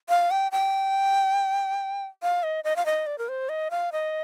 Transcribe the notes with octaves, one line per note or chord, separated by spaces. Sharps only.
F5
G5
G5
F5
D#5
D#5
F5
D#5
D5
A#4
C5
D#5
F5
D#5